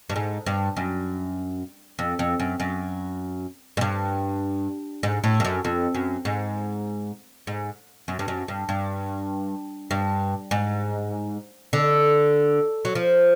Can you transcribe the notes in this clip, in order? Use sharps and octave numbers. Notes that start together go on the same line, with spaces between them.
G2
G#2
G2
F#2
F2
F2
F#2
F#2
G#2
G2
G#2
A2
G2
F#2
F2
F#2
G#2
G#2
F#2
G2
F#2
G2
G2
G2
G#2
D3
F#3
F3